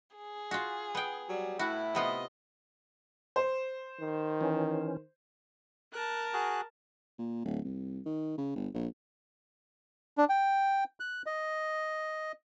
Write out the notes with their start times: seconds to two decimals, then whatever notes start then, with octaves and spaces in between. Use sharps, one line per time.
0.16 G#4
0.51 F4 F#4
0.95 B3 G5
1.29 F#3 G3
1.59 A2 E4 F#4
1.95 C3 B3 F4 D#5
3.36 C5
4.00 D#3
4.41 E3 C#4
5.93 A#4 A5 F#6
6.33 F#4 G#4 F#6
7.19 A#2
7.45 D1
7.65 C2
8.06 D#3
8.38 C#3
8.56 G1
8.74 A#1
10.18 D4
10.29 G5
11.00 F#6
11.26 D#5